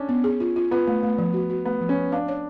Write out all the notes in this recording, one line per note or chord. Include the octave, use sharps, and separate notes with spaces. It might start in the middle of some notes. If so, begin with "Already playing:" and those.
Already playing: C#4 D4
B3
G#4
F4
F4
B3 F4
A3
A3
F3
F#4
F#4
A3 B3
F3
C#4
F3
D4 F5
C#5